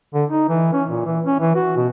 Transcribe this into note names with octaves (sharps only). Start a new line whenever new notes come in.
D3
D#4
E3
C#4
A#2
E3
C#4
E3
F#4
B2